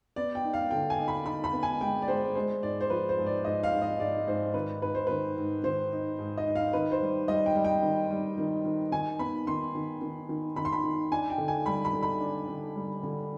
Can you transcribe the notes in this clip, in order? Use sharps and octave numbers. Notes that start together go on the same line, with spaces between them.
B3 D5
G5
D#4
F5
D3 G5
G#5
D#4
B5
D#4 B5
B5
B3
G#5
G#3 G5
D5
G#3 C5
G#3 C5
G#2 D5
C5
F3 B4
C5
G#2
D5
G#2 D#5
F5
G#2
D#5
G#2 D5
G#2 C5
D#3 B4
G#2 B4
C5
D#3 B4
G#2
D#3 C5
D#4
G#2
D#5
D#4
F5
D#3 B4
C5
G3
G3 D#5
G5
G3
G5
D#3
G3
D#3
D#3
D#3 G#5
B3 B5
D#3 C6
D#3
D#3
D#3
D#3 B5
C6
B5
D#3
D4 G#5
G5
D3
G#5
G3 B5
B5
D3
B5
D4
D3
G3
D3